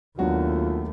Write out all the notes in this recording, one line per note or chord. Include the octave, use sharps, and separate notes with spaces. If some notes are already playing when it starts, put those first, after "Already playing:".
D#2 F#3 A3 B3 D4 F4 F#4